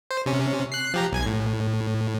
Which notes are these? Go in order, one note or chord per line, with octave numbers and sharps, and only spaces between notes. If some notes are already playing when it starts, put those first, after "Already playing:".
C5
C3 C#4
F#6 C7
F3 G4 A#5
B1 G#5 G#6
A2